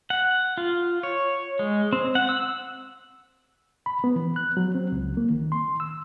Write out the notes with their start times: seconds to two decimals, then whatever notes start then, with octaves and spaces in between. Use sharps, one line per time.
0.10 F#5
0.57 F4
1.03 C#5
1.59 G#3
1.93 C4
2.15 F#5
2.29 E6
3.86 B5
4.04 B3
4.16 E3
4.36 F#6
4.57 F#3
4.75 C4
4.92 C#2
5.17 A#3
5.30 D#3
5.52 C6
5.80 E6